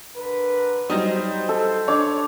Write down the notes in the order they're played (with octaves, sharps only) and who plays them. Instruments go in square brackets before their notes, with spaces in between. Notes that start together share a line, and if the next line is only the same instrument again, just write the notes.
[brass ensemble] D3 A#4 B4
[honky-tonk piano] F#3 G3 D#4 [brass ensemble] C5 [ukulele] D#5
[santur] A4
[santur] D4 D6 [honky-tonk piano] C#5